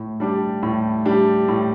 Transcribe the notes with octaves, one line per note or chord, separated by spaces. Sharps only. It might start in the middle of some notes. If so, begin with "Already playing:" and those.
Already playing: A2
G3 D4 G4
A2
G3 D4 G4
A2